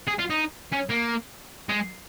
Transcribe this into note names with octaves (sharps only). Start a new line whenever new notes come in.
G#4
F4
D#4
C#4
A#3
G#3